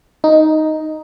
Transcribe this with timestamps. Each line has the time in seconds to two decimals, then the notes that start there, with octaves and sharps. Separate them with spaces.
0.24 D#4